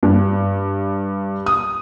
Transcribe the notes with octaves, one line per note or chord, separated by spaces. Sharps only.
G2
D#6